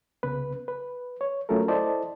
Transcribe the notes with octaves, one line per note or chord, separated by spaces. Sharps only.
C2 C#3 B3 B4
B4
C#5
F#3 A3 C#4 F4 A4 A#4
E4 A4 C5 D5 D#5 A5